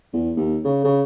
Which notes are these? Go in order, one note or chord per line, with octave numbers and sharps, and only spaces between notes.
E2
D#2
C#3
C#3